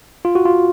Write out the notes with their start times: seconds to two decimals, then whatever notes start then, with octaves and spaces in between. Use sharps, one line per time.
0.25 F4
0.35 F#4
0.45 F4